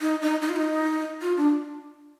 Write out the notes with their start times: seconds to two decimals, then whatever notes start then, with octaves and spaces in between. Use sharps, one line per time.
0.01 D#4
0.22 D#4
0.42 D#4
0.49 F4
0.56 D#4
1.22 F4
1.37 D4